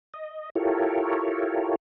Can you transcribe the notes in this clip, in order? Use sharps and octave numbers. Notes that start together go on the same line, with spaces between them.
D#5
E4 F4 G4 A4 A#4 C#5